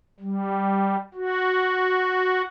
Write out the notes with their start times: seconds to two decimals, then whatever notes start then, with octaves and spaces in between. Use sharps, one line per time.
0.20 G3
1.14 F#4